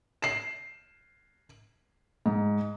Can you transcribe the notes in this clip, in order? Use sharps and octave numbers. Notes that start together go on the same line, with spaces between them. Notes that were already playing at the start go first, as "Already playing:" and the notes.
C7 E7
G#2